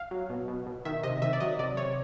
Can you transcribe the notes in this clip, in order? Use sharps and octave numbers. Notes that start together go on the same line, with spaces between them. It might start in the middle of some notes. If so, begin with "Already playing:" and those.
Already playing: F5
F#3
B2
B2
B2
D#3 E5
C3 D#5
D#3 E5
D5
F#3 D#5
C3 D5
C3 C#5